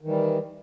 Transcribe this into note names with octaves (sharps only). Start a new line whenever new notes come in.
D#3 E3 G3